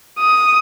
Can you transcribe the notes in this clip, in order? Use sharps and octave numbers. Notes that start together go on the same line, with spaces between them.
D#6